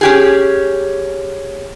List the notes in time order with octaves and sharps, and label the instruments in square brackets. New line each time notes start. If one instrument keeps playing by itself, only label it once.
[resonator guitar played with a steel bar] C#4 G4 G#4